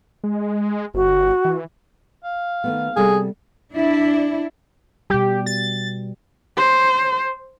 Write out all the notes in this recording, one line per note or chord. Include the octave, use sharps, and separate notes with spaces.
G#3
G1 F#4
E3
F5
D#3 A3 B3
C3 G3 G#4 A4
D4 E4
B2 G3 G4
A6
C5